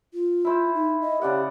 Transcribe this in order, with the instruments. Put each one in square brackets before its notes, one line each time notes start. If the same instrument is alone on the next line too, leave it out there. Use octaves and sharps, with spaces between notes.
[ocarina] F4
[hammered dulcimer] E4 C5
[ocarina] D#4
D#5
[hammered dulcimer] C#3 D5 F#5 [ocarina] G4